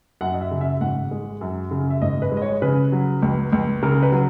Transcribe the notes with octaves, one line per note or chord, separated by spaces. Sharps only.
F#2 F#5
D#5
E5
C#3
E5
G#1 F#5
G#3
F#2
C#3
E5
G#1 D#5
B4
G#3
D#5
C#5
C#3 B4
F#3
C#2
C#2
C#3 A#4
B4
F#3